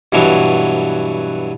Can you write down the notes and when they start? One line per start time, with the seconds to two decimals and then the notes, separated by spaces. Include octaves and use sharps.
0.12 G2 B2 E3 F#3